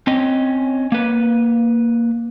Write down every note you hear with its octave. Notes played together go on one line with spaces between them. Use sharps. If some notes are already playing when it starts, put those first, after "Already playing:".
C4 C#4 D#5
A#3 B4